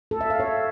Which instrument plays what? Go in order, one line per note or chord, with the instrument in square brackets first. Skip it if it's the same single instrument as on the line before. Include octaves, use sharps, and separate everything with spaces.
[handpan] A4
E5
F5
C#5